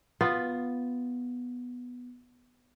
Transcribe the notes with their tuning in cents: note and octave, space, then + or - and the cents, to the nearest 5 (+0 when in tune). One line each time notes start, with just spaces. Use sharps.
B3 +0 F4 +5